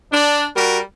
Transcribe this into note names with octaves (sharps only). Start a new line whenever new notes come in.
D4
G3 F#4 G4 A#4